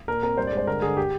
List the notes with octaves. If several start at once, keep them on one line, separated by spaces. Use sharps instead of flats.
A#2 A#4
C4 A#4
G2 C5
G#3 D5
C5
D3 A#4
D3 G#4
G4